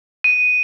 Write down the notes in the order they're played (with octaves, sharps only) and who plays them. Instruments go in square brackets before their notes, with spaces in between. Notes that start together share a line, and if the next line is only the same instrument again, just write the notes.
[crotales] D#7